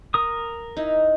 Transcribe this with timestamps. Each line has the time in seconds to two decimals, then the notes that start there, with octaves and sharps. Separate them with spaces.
0.14 A#4 D#6
0.77 D#4 E4